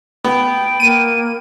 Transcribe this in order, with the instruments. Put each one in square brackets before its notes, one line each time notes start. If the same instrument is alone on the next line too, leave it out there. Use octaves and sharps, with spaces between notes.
[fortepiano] B3 [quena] G5
[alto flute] A#3 [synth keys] D#7